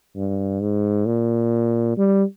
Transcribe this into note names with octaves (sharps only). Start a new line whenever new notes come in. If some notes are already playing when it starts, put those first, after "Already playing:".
G2
G#2
A#2
G3